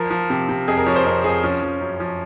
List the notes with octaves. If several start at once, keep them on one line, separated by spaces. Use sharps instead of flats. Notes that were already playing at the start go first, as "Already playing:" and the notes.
Already playing: F3 A#4
F3
C3
C3
F2 G#4
A#4
F3 C#5
C5
F2 A#4
F2 G#4
F3 C#4
F3
F#2
F3